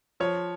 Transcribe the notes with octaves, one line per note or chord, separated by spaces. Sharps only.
F3 C#5